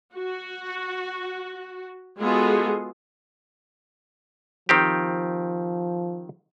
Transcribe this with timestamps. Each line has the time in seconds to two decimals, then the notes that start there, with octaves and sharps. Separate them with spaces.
0.15 F#4
2.20 G#3 B3 F4 F#4 G#4 A4
4.69 D#3 F3 C4 G4